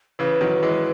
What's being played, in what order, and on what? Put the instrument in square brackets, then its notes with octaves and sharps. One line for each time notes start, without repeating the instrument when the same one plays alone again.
[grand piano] C#3 E3 [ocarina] B4
[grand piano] D#3 F#3
E3 G#3